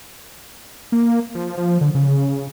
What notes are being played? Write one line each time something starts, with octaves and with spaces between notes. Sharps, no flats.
A#3
F3
F3
D3
C#3